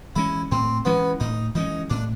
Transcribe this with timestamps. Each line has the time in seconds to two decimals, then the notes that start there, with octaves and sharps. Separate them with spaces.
0.16 E3 G#3 C#4 E4
0.51 A2 C4
0.85 E3 G#3 B3 C#4
1.20 A2 D#4
1.55 E3 G#3 C#4 D#4
1.90 A2 D4